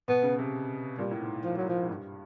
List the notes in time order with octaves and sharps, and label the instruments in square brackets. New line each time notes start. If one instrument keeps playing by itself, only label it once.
[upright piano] B2 [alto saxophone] B3
[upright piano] C#3
C3
[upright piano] A#2 [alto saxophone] G3
[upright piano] A2
G#2
[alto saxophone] F3
F#3
F3
[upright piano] G#2
G2